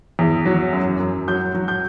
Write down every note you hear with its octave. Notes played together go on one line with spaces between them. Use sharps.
E2
F#3
F#2
F#2
F#3 G6
F#3
G6